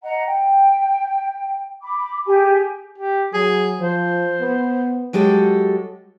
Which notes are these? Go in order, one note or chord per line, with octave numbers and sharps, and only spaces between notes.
D#5 F#5 A#5
G5
B5 D6
G4 G#4 G#5
G4
F#3 G#4
F3 C5
B3
F#3 G#3 G4 A4